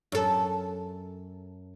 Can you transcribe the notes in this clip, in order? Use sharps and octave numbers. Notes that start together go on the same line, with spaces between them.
F#2 A4